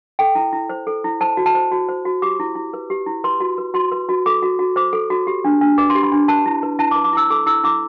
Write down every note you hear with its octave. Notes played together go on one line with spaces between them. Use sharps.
A4 G5
E4
E4
C5
A4
E4
C5 A5
F#4
A5
C5
F#4
C5
F#4
G4 D6
E4
E4
B4
G4
E4
B4 C6
F#4
B4
F#4 C6
B4
F#4
A4 D6
F#4
F#4
C5 D6
A4
F#4
G4
D4
D4
B4 D6
C6
G4
B5
D4
B4 A5
E4
B4
E4 A5
D6
B4
D6
E4 E6
A4 D6
E4 E6
E4 D6